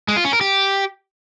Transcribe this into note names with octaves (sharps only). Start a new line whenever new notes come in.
G#3
F4
C#4
A#4
G4